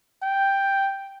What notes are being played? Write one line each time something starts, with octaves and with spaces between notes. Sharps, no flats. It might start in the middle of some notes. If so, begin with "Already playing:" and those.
G5